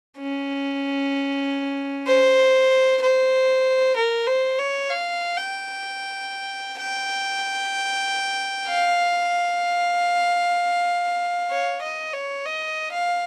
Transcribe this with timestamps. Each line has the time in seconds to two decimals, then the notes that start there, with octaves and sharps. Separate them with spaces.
0.19 C#4
2.07 C5
3.01 C5
3.96 A#4
4.27 C5
4.59 C#5
4.90 F5
5.37 G5
6.79 G5
8.68 F5
11.51 C#5
11.82 D#5
12.13 C#5
12.46 D#5
12.92 F5